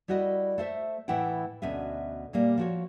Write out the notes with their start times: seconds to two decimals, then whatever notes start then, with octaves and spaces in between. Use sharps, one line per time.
0.08 G3 E4 F#4 A#4 D#5
0.58 A3 C5 E5
1.08 A2 E3 E4 F#5 G5
1.62 D2 B2 C#4 E5
2.33 A#2 G3 A#3
2.58 F3 F#4 C#5